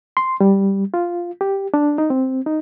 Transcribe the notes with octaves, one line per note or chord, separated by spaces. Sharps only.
C6
G3
F4
G4
D4
D#4
C4
D#4